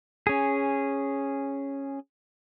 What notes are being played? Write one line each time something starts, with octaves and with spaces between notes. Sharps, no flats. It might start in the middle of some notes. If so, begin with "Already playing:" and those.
C#4 G#4